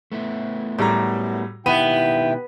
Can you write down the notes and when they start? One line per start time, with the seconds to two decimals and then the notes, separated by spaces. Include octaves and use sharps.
0.12 A3 B3 E4
0.79 F#2 A2 G3 A#5
1.66 B2 D#3 B3 E4 G4 G5 D#7